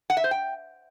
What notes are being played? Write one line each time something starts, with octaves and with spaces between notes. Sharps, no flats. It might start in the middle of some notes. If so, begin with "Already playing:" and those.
F#5
E5
C5
G5